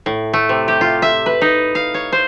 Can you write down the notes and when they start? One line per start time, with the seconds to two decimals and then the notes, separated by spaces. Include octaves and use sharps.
0.06 A2
0.33 A3
0.49 C3
0.68 G4
0.81 F4
1.02 E5
1.26 B4
1.41 D#4
1.75 F5
1.94 C#5
2.12 C5